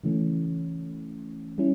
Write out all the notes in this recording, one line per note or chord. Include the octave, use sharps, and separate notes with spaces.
C#3 E3 A3 C#4
G3 C#4 E4